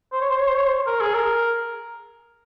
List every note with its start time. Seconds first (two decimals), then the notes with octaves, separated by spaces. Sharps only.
0.12 C5
0.21 C#5
0.30 C5
0.38 C#5
0.48 C5
0.57 C#5
0.66 C5
0.87 A#4
1.01 G#4
1.15 A#4